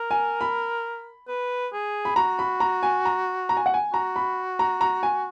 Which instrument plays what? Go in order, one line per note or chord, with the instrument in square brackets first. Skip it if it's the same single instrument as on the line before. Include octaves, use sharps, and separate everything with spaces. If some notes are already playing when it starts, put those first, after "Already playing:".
Already playing: [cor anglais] A#4
[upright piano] G#5
B5
[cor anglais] B4
G#4
[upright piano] B5
[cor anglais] F#4 [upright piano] A#5
[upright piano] B5
A#5
G#5
A#5
A#5
G#5
F#5
G#5
[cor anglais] F#4 [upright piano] A#5
[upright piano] B5
A#5
A#5
G#5